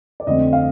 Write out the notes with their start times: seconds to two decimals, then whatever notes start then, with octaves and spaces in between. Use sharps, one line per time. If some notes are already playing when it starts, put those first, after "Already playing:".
0.20 D5
0.27 F2 D3 A3 C4 D#5
0.53 F5